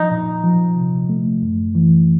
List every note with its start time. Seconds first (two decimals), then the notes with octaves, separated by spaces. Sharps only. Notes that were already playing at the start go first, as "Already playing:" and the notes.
Already playing: F3 D#4
0.11 A#2
0.43 F3
0.77 C3
1.09 A3
1.42 F#2
1.75 E3